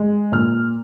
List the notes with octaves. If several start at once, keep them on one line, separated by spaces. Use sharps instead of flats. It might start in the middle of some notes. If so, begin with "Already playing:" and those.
Already playing: G#3
A#2 F6